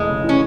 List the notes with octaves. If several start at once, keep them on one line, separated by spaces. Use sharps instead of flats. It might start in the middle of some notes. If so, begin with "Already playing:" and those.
Already playing: F1 E3 G#3
C#3
E3 C#4